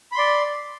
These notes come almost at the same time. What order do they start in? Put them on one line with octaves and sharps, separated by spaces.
B5 C6 D5